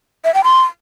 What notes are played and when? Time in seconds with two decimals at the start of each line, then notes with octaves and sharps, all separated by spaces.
0.25 E5
0.34 G5
0.44 C6